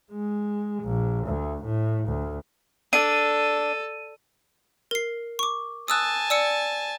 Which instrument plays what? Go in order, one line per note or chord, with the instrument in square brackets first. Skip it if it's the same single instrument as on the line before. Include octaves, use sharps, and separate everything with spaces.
[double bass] G#3
A#1
D2
A2
D2
[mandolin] D4 [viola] A4 [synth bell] D#7
[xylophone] A#4 C7
C#6 D6
[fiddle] G#5 A5 [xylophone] D#6 E6 F#6
[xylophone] D5 E6 C#7